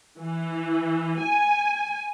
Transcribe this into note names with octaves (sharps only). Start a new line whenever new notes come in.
E3
G#5